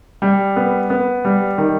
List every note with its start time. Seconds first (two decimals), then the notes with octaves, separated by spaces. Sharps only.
0.22 G3
0.56 B3
0.90 B3
1.25 G3
1.58 D#3